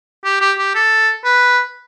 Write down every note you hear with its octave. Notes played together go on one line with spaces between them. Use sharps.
G4
G4
G4
A4
B4